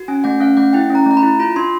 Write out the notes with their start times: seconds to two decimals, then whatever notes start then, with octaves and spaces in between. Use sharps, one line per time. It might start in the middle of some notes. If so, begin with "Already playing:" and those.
Already playing: F#4
0.08 C#4 G#5
0.24 A3 F#5
0.40 C#4 F5
0.57 A3 F#5
0.73 E4 G5
0.90 C#4
0.95 A#5
1.06 A3 A#5
1.17 B5
1.23 E4
1.39 F4 B5
1.56 D4 C6